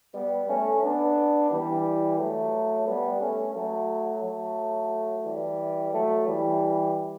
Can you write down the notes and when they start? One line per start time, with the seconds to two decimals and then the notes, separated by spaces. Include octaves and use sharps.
0.15 G3 B3
0.49 A3 C#4
0.82 B3 D4
1.51 E3 G3
2.19 F#3 A3
2.87 G3 B3
3.21 A3 C#4
3.55 F#3 A3
4.24 F#3 A3
5.25 E3 G3
5.94 F#3 A3
6.28 E3 G3